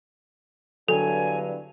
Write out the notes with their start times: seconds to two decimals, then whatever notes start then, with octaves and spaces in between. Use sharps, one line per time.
0.88 E2 G2 D3 F#3 A4 G#5